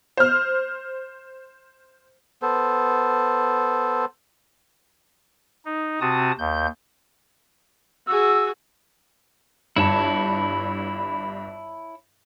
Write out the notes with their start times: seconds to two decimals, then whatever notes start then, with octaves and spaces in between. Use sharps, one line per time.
0.17 C5 F6
2.42 B3 A4 C5
5.65 D#4
6.01 C3 C4 F#4 A5 D#6
6.39 D#2 G6
8.07 F#4 G#4 E6
9.76 G1 G2 E4 C#5 A5